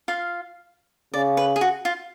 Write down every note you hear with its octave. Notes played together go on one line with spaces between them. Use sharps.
F4 F5
C#3 D5
B4
G#4
F#4
F4